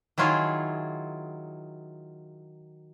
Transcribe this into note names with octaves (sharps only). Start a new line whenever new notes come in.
D#3 F#3 E4 F4 G#4